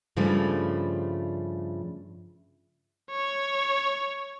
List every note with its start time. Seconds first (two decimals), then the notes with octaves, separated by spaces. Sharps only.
0.16 G2 C#3 F3 G3 A3
3.10 C#5